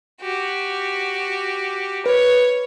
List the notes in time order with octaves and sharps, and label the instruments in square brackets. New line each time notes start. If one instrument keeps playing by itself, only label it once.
[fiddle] F#4 G4
[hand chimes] B4 [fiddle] C#5